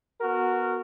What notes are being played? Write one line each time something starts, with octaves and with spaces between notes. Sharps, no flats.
B3 F#4 A#4